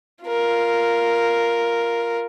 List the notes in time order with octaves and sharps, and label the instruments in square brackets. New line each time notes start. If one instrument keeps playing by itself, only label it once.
[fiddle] F4 A#4